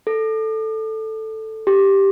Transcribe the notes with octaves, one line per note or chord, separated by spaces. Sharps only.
A4
G4